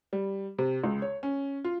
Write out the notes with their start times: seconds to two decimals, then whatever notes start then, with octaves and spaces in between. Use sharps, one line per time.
0.13 G3
0.59 C3
0.84 C#2
1.02 C#5
1.23 C#4
1.64 F4